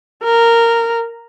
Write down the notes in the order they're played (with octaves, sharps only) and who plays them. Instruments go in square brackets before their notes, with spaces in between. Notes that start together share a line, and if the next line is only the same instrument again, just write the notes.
[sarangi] A#4